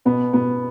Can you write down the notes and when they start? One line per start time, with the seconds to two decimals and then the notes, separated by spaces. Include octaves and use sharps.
0.05 B2 B3
0.33 B2 B3